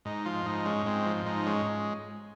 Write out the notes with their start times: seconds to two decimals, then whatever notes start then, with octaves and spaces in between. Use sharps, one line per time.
0.05 G#2 D#4
0.25 F3 F4
0.46 G#2 D#4
0.65 G#3 C#4
0.86 G#2 C4
1.06 F3
1.26 G#2 D#4
1.46 G#3 C#4